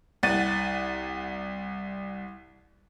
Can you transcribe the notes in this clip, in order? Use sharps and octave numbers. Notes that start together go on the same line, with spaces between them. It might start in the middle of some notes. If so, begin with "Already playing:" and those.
C2 F#5 A6 D#7